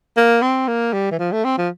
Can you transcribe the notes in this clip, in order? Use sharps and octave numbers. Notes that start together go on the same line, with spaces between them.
A#3
C4
A#3
G3
E3
F3
A3
C4
F3